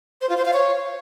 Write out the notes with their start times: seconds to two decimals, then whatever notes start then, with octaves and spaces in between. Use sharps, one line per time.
0.21 C5
0.29 F4
0.37 C5
0.45 F5
0.53 C#5